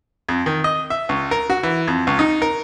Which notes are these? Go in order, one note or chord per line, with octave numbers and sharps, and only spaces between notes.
F2
D#3
D#5
E5
C#2
A#4
F#4
E3
F2
C#2
D#4
A#4